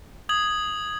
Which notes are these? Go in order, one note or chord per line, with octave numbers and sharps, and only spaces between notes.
D#6 G#6 F#7